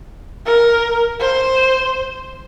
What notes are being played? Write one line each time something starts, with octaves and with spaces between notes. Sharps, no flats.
A#4
C5